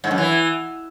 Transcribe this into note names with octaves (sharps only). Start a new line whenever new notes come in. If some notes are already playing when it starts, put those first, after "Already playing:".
G#2
F#2
E3